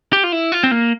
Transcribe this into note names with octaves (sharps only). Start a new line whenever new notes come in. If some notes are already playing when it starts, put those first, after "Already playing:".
G4
F4
E4
F4
C4
A#3